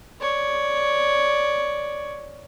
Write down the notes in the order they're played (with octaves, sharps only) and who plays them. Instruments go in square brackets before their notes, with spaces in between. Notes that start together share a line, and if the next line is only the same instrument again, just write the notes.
[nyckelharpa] C#5 D5